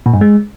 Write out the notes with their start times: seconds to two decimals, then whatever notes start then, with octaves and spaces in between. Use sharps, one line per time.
0.06 A#2
0.14 G2
0.21 G#3